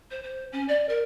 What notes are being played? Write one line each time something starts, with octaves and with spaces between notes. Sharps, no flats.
C5
C5
C#4
D5
A#4